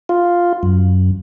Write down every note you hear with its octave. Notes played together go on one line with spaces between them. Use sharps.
F4
F#2